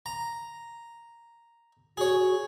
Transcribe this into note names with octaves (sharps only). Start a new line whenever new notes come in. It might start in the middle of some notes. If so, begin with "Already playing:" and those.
A#5
F#4 G#4 C#5